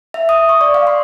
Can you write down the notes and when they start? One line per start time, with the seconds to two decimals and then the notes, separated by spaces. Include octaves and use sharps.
0.14 E5
0.29 D#6
0.49 C#6
0.61 D5
0.74 F5
0.87 C6